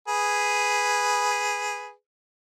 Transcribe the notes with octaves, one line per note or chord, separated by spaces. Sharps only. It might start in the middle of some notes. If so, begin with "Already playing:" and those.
G#4 B4